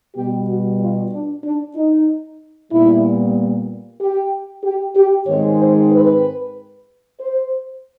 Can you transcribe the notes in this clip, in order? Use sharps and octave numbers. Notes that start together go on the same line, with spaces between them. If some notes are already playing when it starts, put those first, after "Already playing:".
B2 G3 B3 G4
F#4
F4
D4
D4
D#4
A#2 G3 B3 E4
G4
G4
G4
G#2 D#3 G#3 C4 C#5
C5
B4
C5